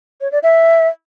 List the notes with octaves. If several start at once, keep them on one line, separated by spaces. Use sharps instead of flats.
C#5
D5
E5